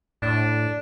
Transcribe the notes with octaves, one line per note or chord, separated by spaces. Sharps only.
A2 D4